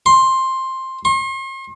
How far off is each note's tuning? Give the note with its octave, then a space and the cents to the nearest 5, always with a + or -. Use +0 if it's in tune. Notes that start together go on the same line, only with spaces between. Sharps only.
C6 +10
C6 +45